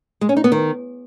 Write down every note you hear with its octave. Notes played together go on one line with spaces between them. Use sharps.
G#3
C#4
D#4
B3
D#3